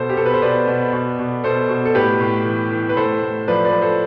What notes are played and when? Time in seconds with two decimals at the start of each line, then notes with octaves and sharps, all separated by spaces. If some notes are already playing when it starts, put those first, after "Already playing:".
Already playing: B2 A4 C5
0.09 G4
0.17 B2 A4
0.26 B4
0.33 C5
0.42 B2 B4 D5
0.68 B2
0.93 B2
1.19 B2
1.44 B2 A4 C5
1.69 B2
1.85 A4
1.95 A2 G4 B4
2.21 A2
2.45 E3
2.72 E3
2.89 B4
2.97 A2 A4 C5
3.22 A2
3.48 F3 B4 D5
3.64 B4 D5
3.73 F3
3.82 A4 C5